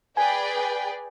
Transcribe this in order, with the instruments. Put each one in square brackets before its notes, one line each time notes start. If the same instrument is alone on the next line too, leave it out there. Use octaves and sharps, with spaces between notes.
[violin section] G#4 B4 D5 G5 [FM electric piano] G#5